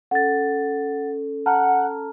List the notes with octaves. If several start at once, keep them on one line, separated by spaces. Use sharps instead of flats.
C#4 A4 F#5 A6
F#5 A5 A#5 F6